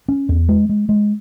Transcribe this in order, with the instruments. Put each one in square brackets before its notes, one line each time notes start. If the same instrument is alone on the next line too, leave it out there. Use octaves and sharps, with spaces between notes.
[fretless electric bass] C#4
E2
G#3
G#3
G#3